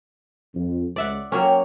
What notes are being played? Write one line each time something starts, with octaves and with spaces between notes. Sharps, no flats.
F2
C#2 D5 E5 F#5
F#3 A#3 C#4 C#5 G5